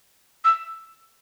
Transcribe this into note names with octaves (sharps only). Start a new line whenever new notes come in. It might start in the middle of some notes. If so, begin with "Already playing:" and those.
E6